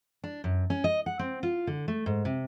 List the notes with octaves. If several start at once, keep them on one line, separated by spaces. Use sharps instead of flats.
D4
F#2
C#4
D#5
F#5
C4
F4
D3
A3
G#2
C3